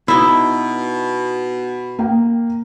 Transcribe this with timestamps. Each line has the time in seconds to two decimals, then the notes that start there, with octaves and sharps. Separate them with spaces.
0.08 B2 D#4 E4
1.99 A#3 G5